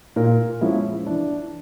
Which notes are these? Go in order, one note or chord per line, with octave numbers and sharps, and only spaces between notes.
A#2 A#4
F3 G#3 C#4 E4
E3 D4